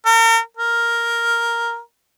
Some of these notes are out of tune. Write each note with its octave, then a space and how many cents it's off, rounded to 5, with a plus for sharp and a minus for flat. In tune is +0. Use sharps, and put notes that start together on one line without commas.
A#4 -40
A#4 +0